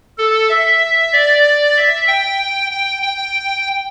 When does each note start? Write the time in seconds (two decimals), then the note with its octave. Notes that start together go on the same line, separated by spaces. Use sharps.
0.18 A4
0.49 E5
1.13 D5
1.77 E5
2.08 G5
2.71 G5
3.02 G5